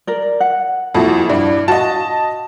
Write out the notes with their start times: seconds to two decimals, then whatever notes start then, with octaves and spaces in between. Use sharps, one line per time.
0.07 A#4 D5
0.40 F#5
0.95 F2 A#2 E4 F#4 A5
1.29 G2 E4 D5
1.68 F#4 D#5 F5 A5